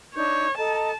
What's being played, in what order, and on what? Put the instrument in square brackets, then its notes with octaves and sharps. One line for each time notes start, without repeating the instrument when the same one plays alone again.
[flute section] D4 D#4 G6 [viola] C#5
[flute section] A4 D#5 A#5 [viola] A5